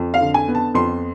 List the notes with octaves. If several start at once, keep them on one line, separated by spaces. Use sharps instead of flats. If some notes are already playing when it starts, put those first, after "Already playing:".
Already playing: F2
F5
D3
G#5
B3
A5
F2 C6